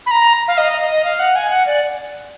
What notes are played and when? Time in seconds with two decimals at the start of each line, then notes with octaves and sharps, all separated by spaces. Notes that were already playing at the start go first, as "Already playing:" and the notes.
0.06 B5
0.11 A#5
0.48 F5
0.58 D#5
0.81 D#5
1.05 F5
1.19 F#5
1.36 G#5
1.51 F#5
1.66 D5